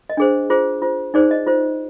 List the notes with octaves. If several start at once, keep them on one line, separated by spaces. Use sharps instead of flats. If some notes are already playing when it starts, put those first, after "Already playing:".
D#5
D4 G#4 C5
F4 G#4 C5
F4 C5
D#4 G#4 C5 D5
D#5
F4 C5